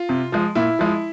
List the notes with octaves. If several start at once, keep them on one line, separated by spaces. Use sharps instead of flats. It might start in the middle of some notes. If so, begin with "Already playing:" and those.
Already playing: F4
C3
F3 G#3
A#2 E4
F3 G#3